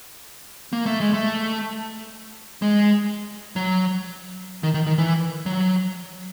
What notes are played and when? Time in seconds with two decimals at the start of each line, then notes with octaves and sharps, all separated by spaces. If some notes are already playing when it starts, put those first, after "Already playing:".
0.73 A#3
0.86 A3
1.00 G#3
1.13 A3
2.62 G#3
3.56 F#3
4.63 D#3
4.74 D#3
4.87 D#3
4.98 E3
5.46 F#3